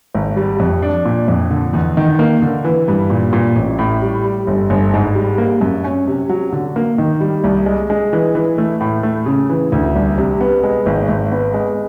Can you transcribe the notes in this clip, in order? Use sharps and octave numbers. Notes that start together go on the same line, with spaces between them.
G#1
G3
F2
D4
A#2
F2
D3
E2
D#3
A#3
D3
E3
G2
A#2
A#2
A1
A2
G3
G3
G1
G1
G#2
G3
A#3
F#2
C#4
C3
F#3
D3
A#3
D#3
G3
C2
G#3
G#3
E3
E3
A3
A2
A3
C#3
E3
D2
C2
C3
B3
G#3
G#1
G#1
B3
G#3